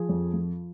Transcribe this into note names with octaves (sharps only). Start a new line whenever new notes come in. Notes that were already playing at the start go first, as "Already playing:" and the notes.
Already playing: F3 G#4
F2
F3